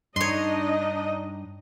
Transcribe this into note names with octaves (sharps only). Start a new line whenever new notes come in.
G2 G3 D4 D#4 C#5 D#5 C6